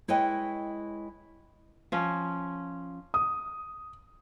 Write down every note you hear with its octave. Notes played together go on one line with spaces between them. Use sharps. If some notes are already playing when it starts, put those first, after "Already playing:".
G#3 E4 B4 C#5 D#5 G5
F3 C#4
D#6